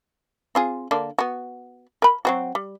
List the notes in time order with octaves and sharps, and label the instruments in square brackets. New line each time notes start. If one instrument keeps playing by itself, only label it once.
[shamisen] C4 F4 G#4
D3 A#3 D4
B3 F#4
A#4 B5
F#3 C4 F#4
G3